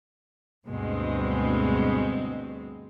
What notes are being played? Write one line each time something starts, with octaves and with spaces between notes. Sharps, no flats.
D2 G2 B2 G#3 C4